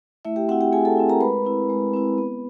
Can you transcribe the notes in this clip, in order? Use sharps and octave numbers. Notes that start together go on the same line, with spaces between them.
A3 E4 E5
G4 G5
C4 E4 F#4 F#5
G4 G5
A3 G#4 G#5
A4 A5
C4 E4
A#4 A#5
G#3 B4 B5
C4 E4
G#3
C4 E4
B3